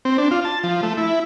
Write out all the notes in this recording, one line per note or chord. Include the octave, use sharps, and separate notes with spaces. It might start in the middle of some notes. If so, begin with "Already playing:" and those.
C4
D4
F4
A5
F3
A3
E4